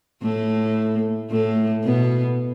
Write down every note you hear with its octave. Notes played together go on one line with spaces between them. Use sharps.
A2 A3
A2 A3
B2 B3